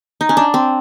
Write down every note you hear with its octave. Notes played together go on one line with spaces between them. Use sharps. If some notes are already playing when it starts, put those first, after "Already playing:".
D#4
C#4
D4
C4